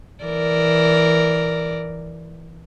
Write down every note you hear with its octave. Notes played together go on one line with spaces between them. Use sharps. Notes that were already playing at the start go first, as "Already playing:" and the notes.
E3 A#4 D5